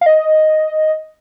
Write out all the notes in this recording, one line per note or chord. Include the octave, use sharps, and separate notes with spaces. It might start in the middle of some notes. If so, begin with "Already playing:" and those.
F5
D#5